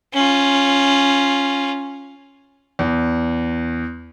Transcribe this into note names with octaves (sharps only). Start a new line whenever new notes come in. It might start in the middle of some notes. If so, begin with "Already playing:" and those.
C#4 F4
E2